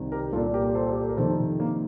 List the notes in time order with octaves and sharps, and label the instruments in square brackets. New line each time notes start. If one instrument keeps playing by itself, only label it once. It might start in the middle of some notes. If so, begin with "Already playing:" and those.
Already playing: [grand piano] C2 C3 D#3
G4 A#4
C2 F4 A4
A#2
G4 A#4
A4 C5
G4
A4
A#4
F2 C3 D#3 A4 C5
A#3 D4